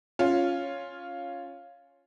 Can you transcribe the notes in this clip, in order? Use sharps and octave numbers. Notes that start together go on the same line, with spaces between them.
C#4 F4